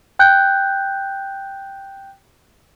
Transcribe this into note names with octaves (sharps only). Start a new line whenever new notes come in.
G5 F#6 G6